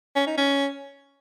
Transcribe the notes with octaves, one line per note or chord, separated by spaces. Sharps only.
C#4
D#4
C#4